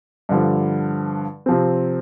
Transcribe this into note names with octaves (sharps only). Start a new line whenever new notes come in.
G2 D3 F3
C3 F3 C4